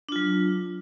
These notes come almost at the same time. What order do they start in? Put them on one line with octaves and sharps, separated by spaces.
D4 F4 F#3